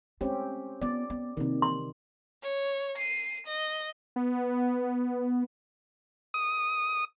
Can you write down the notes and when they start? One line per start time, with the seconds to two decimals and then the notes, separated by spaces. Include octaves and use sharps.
0.21 G#3 A3 C4 C#4 G4
0.81 B3 F4 D5
1.10 B3
1.37 C3 D#3 A#3 C4
1.62 C6
2.43 C#5
2.98 C7 D#7
3.47 D#5
4.16 B3
6.34 D#6